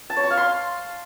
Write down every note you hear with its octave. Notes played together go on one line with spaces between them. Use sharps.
A5
C#5
C#6
F5
C6